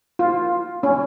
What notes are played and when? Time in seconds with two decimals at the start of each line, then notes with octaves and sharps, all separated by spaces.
0.19 F4
0.83 C#4